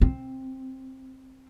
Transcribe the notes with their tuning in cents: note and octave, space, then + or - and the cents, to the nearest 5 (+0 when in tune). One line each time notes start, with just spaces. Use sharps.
C4 +10